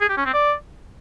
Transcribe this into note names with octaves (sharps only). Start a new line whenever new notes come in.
G#4
G4
C#4
C4
D5